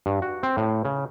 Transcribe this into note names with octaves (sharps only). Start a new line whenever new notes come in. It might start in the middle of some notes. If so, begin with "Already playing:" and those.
G2
F#4
C4
A2
C#3